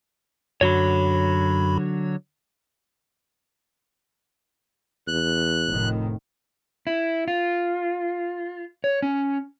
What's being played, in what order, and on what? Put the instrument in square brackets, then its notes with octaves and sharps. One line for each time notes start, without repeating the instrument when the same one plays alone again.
[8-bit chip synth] F#2 F#4 B5 [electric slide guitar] D3 F#3 C#5
[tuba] E2 [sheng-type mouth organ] F#6
[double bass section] F1 A2 D#3
[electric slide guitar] E4
F4
C#5
C#4